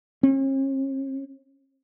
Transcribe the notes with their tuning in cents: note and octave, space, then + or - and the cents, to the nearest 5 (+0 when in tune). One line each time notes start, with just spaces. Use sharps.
C#4 -45